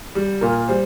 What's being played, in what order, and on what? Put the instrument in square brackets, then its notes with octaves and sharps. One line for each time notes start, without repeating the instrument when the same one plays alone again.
[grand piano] G3
A#2 A#4
G3 C5